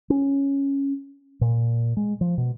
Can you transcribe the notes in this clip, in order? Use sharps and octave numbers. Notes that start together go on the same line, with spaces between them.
C#4
A#2
G#3
F3
B2